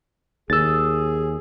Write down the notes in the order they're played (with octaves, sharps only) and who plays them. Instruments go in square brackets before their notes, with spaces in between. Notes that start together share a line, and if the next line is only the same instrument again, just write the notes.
[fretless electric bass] D#2 [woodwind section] G#4 [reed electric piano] E6 A6